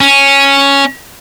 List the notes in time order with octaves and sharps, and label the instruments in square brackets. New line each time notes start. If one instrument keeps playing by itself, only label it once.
[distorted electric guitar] C#4